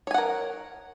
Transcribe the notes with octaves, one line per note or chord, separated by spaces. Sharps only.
A#4 C#5 F#5 G#5